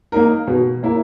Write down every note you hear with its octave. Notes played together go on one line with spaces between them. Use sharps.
A#3 D#4 A#4
B2
A#3 E4 A#4